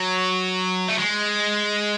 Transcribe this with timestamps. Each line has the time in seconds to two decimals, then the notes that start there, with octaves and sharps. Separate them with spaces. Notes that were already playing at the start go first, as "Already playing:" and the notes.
Already playing: F#3
0.89 A3
0.98 G#3